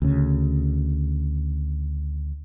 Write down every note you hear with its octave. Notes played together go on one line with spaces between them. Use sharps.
D2 C#3